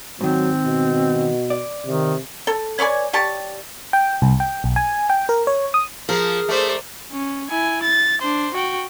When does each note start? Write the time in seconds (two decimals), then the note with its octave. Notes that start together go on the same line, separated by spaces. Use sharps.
0.21 G#2 D#3 F#3 C4
0.66 B2
1.50 D5
1.86 C3 D#3
2.47 A4
2.79 B4 C#5 D5 G#5
3.13 G3 G4 C#5 A5
3.93 G5
4.22 C2
4.40 G5
4.64 B1
4.76 G#5
5.10 G5
5.29 A#4
5.47 C#5
5.74 D#6
6.09 F3 G#4 A#4
6.49 A3 C5 D5
7.12 C#4
7.50 E4 G#5
7.83 A6
8.21 D4 C5
8.54 F#4 G5